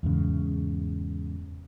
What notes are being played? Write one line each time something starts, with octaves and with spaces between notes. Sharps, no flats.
E2 G#2 C#3